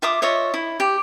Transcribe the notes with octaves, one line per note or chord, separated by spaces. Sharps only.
F4 E5 D6 D#6
F4 C#5 D#5 E5
E4
G4